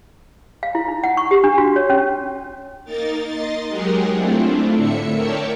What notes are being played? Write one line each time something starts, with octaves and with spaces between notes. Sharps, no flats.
F5
E4
D#4
F#5
C#6
G4
D4
F#4
C#5
C#4
A#3 D#4 A#4 A6
D#5 C6 A6
F#3 G#3 G4 G#4 A#4 F#5
A3 C4 D4 E4 F4
A2 D3 E5 C#7
A#4 C#5 D5 E5 G5 A5